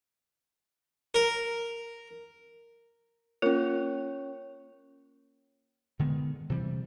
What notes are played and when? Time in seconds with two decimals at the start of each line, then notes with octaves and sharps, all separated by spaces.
1.14 A#4
3.42 A#3 C#4 F4 A#4 C#5
5.99 D3 D#3 G#3 B3
6.50 C3 E3 F#3 G3